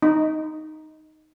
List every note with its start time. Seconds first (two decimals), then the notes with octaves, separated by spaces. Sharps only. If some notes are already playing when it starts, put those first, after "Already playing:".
0.03 D#4